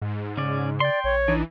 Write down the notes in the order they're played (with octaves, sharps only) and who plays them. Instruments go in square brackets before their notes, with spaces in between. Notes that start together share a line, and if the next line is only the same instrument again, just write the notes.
[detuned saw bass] G#2
[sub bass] C#3 [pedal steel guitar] C#4 D5
[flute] D5 [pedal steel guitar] G5 C6
[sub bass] A#1 [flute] C#5
[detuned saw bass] E3 [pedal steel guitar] D4 D#4